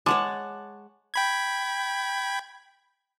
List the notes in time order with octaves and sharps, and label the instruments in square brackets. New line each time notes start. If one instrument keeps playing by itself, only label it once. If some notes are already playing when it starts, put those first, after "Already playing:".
[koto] G#3 [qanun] C#5 F#5 A5 [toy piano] D6
[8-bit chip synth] G5 B5 G#6